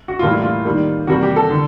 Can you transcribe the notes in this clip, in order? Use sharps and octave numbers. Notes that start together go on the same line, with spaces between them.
F#4
A2 E3 G3 A#3 F4
E4
F4
D#3 G3 A#3
C3 E3 G3 A#3 F#4
G4
A4
D3